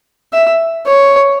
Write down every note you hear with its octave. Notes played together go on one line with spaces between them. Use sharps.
E5
C#5